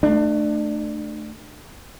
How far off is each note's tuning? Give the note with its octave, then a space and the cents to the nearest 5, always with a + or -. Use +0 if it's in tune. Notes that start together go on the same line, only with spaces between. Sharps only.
A3 +0 D4 +30